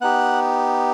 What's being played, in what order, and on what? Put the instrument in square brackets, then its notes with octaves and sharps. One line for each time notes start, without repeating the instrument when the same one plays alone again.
[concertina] B3 D#4 G4 F#5